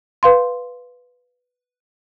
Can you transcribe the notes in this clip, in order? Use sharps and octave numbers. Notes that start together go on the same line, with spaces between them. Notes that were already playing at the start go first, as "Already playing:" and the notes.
B4 F5 C6